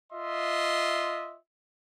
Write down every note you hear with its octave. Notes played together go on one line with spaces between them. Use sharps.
F4 D#5 E5 C6